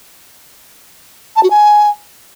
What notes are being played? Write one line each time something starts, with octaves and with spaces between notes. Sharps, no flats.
A5
F#4
G#5